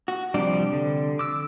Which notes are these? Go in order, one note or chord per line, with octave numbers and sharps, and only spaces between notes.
F#4
C3 F3 G3 D4
D3
D6 E6